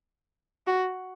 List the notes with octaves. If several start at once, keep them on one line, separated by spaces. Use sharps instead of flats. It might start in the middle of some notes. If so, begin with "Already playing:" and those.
F#4